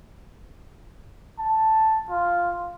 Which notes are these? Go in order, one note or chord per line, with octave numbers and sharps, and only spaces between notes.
A5
F4